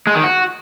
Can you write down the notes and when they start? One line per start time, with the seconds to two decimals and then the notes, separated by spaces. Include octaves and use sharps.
0.07 G#3
0.15 D#3
0.24 F#4